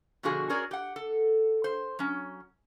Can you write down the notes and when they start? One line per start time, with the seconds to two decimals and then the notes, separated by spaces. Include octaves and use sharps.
0.23 B2 D3 F3 F#4 G#4
0.49 C#4 F#4 G#4 A#4 C#5 D5
0.71 G4 F#5
0.96 A4
1.64 C5
1.99 F#3 C#4